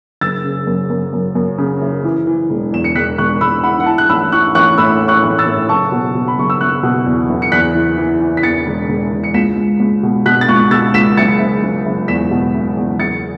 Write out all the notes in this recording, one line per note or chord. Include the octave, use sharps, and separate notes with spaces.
F#1 E6 A6
C#3
F#2
F#2
F#2
F#2
C#3
F#1
E3
E3
E1
E2 E7
C#7
E1 F#6 B6
E1 C#6 F#6
E1 B5 E6
E3 F#5 B5
F#5
E3 A5
F#6
A1 B5 E6
E3 C#6 F#6
A1 C#6 F#6
A2 B5 E6
A2
C#6 F#6
A1
E6 A6
A2
F#1 A5 C#6
B2
B2
B5
F#1 C#6
E6
F#1 C#6 F#6
B2
E2
F#1
C#7
E2 F#6 B6
E3
E3
E3
B6
E2 A6 C#7
E1
E1
E1
C#7
C#2 B6 E7
C#2
C#2
B2
B2 F#6 B6
A6
C#2 C#6 F#6
B2 E6 A6
C#2 B6 E7
F#1 A6 C#7
F#1
F#1
F#1
E2 B6 E7
B2
F#1
E2
F#1 A6 C#7